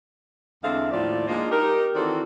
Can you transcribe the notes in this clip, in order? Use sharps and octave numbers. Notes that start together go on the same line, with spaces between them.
E2 D3 G#3 C4 E5 F5
D#2 A2 F3 F4 D5
F3 G#3 A#3 D4 D#4 F4
D#4 G4 A#4
D#3 E3 C4 F#4 A4 D5